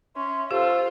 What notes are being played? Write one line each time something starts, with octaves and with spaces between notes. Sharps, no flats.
C#4 E5 C6
F4 G4 A4 C5